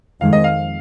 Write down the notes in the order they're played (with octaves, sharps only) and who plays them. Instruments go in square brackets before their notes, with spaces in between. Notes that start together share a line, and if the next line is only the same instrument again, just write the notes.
[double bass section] F2 D#3 G#3 [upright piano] F5
[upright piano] D#5
F5